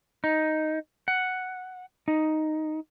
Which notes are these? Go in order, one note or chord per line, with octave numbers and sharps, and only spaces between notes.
D#4
F#5
D#4